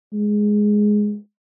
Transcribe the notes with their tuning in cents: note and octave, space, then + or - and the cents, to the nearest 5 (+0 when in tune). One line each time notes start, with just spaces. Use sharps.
G#3 +5